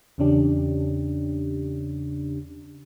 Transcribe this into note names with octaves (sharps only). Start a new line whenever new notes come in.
E2 C#3 C#4 D4 G4